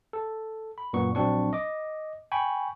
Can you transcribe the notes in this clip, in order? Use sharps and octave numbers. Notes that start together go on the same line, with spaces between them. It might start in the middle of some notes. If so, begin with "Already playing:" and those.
A4
B5
F#2 A#2 B3 C#6
A#1 F#3 C4 D4 C#6
D#5 D6
G5 G#5 B5 C#6